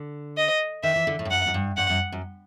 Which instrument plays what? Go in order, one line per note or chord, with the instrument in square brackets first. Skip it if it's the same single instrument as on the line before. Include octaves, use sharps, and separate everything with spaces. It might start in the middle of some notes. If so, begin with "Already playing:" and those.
Already playing: [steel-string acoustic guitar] D3
[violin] D#5
[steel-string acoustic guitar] D#3 [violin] E5
[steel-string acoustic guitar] E3
D3
A2
G2
[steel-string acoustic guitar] F#2 [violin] F#5
[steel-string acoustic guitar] F#2
G2
[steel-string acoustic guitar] G2 [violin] F#5
[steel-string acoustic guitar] F#2
F#2